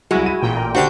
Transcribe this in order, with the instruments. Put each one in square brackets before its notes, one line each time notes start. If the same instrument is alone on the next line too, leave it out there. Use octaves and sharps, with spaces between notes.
[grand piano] C2 F#3 [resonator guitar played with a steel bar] G#3 [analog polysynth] E4 F#4
[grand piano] D#7
[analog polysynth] A1 A#2 G5
[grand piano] A#5
[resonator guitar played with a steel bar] D3 D4 F#4 [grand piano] G4 C5 G5 [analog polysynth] G6